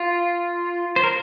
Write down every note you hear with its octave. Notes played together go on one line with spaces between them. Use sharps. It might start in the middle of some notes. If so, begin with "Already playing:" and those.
Already playing: F4
C5
A#4